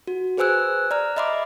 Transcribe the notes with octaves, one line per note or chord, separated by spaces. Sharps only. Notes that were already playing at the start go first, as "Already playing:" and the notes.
F#4
G#4 B4 C5 G#5 E6 F#6
D5 A#5 F6
D#5 E5 B5 C6 D6